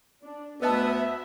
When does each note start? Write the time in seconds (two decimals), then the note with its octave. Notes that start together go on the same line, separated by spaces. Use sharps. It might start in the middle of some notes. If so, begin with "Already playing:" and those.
0.22 D4
0.62 D2 B3 B4 D#5 E5 A5